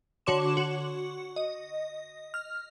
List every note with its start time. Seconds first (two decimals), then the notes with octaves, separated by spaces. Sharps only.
0.26 D3 F#4 C#5 C6 D6 E7
0.57 F#4
1.36 D#5
2.34 F6